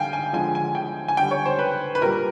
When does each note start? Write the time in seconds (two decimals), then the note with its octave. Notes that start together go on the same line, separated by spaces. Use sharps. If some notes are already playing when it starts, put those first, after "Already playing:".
Already playing: D3 G3 F5 G5 G#5
0.13 G#5
0.33 D3 F3 G#3 G#5
0.55 G#5
0.75 G5
1.08 G#5
1.17 D3 G3 G5
1.31 C#5
1.45 C5
1.59 B4
1.95 B4
2.02 A#2 G3 A#4